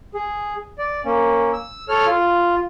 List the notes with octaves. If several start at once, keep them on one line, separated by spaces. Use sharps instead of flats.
G#4
D5
A#3 C#4
E6
A4 C#5 F6
F4